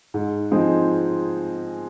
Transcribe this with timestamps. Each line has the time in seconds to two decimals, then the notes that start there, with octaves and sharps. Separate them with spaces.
0.14 G#2
0.52 F3 C4 D#4 G#4